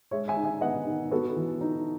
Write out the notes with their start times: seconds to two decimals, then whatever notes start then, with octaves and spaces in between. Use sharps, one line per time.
0.11 G#3 C#5 E5
0.28 E5 G#5
0.36 D#4
0.45 E5 G#5
0.61 B3 D#5 F#5
0.87 D#3
1.11 B3 F#4 A4
1.36 E3
1.61 D#4